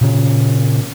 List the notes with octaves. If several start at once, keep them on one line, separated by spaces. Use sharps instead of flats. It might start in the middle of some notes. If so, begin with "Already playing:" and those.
A#2 C#3